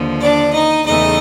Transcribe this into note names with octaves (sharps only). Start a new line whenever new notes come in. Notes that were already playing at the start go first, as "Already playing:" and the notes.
Already playing: D#2 D3 F3
D4 D5
D#4 D#5
E2 C#3 E3 A3 D#4 D#5